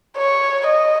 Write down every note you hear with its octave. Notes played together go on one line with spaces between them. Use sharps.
C#5
D#5